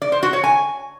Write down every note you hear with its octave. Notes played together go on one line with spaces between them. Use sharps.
D5
C5
F#4
C#5
G#5